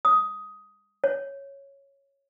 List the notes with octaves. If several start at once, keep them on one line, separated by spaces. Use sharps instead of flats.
D#6
C#5